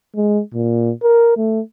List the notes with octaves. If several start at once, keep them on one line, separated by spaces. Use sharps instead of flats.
G#3
A#2
A#4
A3